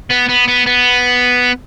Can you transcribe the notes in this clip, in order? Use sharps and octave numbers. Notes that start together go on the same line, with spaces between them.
B3
B3
B3
B3